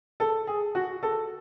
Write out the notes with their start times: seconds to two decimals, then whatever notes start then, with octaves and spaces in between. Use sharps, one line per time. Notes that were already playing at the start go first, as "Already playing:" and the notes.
0.20 A4
0.47 G#4
0.75 F#4
1.03 A4